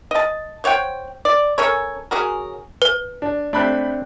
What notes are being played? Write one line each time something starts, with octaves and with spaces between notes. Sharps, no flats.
D#5 A5
C5 C#5 F#5 G5
D5
C#4 A4 A#4 C#5
C#4 F#4 G#4 A#4
B4
D4
A3 C4 D4 B5 F#6